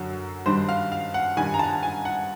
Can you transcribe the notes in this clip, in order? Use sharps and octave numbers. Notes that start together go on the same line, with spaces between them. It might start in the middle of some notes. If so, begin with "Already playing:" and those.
Already playing: F#2 D3 F#3
G2 D#3 G3 C5
F5
F5
F#5
G2 D#3 G3 G#5
A#5
A5
G#5
F#5